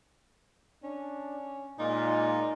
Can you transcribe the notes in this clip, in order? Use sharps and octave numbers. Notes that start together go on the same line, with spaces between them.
C#4 D4
A#2 G#3 D#4 F4 D5